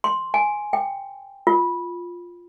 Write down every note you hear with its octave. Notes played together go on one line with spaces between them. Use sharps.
C6
G#5
G5
F4